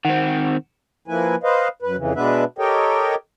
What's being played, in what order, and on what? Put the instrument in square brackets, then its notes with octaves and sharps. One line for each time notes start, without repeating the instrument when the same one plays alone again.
[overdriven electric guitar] D#3 C4 [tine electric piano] F#5
[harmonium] F3 A#3 E4 B4 G#5
B4 C5 D#5 F5
F#2 B4
F2 C#3 E3
B2 G#3 B3 D4 B4 E5
G4 A4 A#4 C#5 D#5 G5